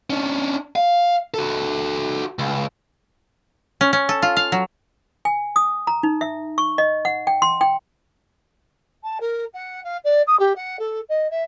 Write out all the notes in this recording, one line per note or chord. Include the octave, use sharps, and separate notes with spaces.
C#4 D4
F5
F#4 A4
C#2
C#4
C#4
A4
F4
F5
F#3
G#5
D#6
A#5
D#4
E5
C#6
D#5
F#5
G5
C6
G5
A5
A#4
F#5
F5
D5
D#6
G4
F#5
A4
D#5
E5